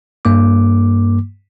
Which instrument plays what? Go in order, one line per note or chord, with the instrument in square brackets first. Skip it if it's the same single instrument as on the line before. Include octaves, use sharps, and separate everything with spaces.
[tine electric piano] G2 A#3 D6